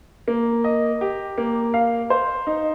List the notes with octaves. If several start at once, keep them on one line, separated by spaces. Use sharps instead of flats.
A#3
D#5
G4
A#3
F5
C5
D#4